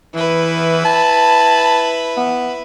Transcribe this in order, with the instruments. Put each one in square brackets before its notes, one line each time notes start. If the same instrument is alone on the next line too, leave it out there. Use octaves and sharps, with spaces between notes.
[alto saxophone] E3 [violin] E4 B4
[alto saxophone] A5
B3